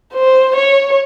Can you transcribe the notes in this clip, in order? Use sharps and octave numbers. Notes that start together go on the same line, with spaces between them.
C5
C#5